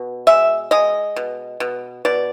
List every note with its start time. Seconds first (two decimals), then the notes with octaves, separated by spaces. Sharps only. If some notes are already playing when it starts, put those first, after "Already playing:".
Already playing: B2
0.27 G#3 E5
0.71 G#3 D#5
1.16 B2
1.60 B2
2.05 B2 D5